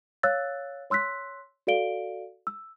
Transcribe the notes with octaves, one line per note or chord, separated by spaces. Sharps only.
C#5 F5 E6 F#6 A6
C#5 C6 E6 F#6 B6
F#4 A4 D5 F5 D7 G7
E6